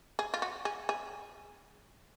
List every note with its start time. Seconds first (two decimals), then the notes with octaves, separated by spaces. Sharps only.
0.19 G#4
0.34 F4
0.42 F#4
0.65 G#4
0.89 G#4